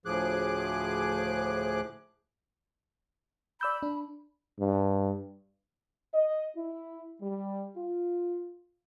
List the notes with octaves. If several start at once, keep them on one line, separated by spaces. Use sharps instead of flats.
D2 A2 F3 G#4 D6 F#6
D5 B5 E6 G6
D4
G2
D#5
E4
G3
F4